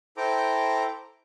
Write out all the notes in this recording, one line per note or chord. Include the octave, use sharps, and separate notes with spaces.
E4 A4 C5 G5 A#5 D6